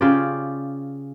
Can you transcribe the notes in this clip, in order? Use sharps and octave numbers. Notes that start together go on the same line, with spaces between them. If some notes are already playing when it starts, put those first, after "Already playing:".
C#3 F4 G4 D5